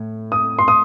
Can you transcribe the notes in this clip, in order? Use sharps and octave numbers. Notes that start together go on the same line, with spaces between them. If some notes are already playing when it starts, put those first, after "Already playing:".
Already playing: A2
D#6
C6
D#6